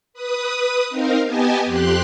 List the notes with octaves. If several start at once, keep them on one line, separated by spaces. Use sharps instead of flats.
B4 D#6
C4 D#4 A#4 F5
B3 G4 D#5 G#5 A5
F2 G4 C6 F#6